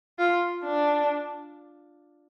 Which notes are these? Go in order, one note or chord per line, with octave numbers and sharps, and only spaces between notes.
F4
D4